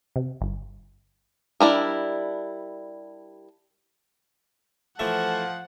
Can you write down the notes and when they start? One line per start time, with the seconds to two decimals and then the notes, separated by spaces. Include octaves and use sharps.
0.16 C3
0.41 G1
1.60 G3 D4 E4 A#4
4.99 E3 F3 A3 E5 F#5 A5